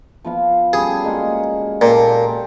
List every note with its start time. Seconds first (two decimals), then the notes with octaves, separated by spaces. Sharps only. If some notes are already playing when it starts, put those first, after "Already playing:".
0.25 F3 B3 F5
0.73 G3 C#4 G#4 A4
1.04 G#3 A#3 F#4
1.81 A#2 G4 A4 A#4